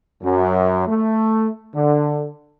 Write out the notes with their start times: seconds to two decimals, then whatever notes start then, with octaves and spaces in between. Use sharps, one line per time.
0.22 F#2
0.87 A3
1.74 D3